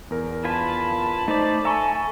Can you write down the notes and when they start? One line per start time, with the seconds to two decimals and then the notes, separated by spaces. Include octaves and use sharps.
0.10 E2 A#4
0.45 F4 B4 G#5 A5 B5
1.28 A3 D#4 C5 D5
1.65 A4 E5 G#5 A#5 C#6